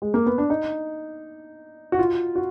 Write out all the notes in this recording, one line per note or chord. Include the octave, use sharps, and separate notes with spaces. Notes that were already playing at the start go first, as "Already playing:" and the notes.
G#3
A#3
B3
D4
D#4
F#4
F4
F#4